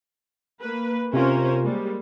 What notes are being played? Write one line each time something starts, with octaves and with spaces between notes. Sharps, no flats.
A#3 B4
C3 C#4 F4 A#4 C5
G3 G#3 A#3